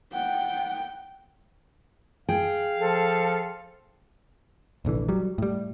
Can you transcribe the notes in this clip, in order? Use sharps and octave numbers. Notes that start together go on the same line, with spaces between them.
F#5 G5
G#4 F5 G5
F3 A4
F1 A#1 D3 E3
F#3 G3
A2 G3